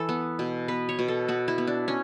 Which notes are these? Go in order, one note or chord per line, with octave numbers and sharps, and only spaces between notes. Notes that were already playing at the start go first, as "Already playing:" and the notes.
Already playing: E3 A4
B3
B2
B3 B4
C#5
B2
A4
B3 F#4
E4
B3
D4
C#4